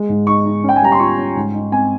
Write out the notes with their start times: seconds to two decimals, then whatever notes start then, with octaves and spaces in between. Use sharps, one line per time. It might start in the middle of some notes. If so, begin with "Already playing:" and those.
Already playing: G#3
0.09 G#2
0.27 D#4 C#6
0.45 D#4
0.64 C#4 G5
0.76 G#5
0.82 G3 A#5
0.92 C6
1.00 F4 C#6
1.18 C#4
1.36 G#2
1.54 D#4
1.72 C4 G#5